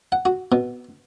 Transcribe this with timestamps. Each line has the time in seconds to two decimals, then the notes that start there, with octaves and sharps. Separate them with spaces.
0.12 F#5
0.25 F#4
0.52 B2